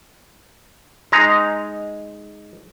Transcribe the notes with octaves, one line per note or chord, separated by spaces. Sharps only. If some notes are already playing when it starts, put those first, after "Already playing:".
G#3 D#4 A#5